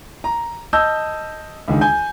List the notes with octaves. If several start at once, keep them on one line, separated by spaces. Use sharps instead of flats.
A#5
D#5 A5 E6 G6
C#2 D3 D#3
G#5 G6